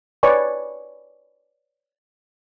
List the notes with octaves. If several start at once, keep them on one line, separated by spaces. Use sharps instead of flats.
B4 C#5 D5 G#5 C#6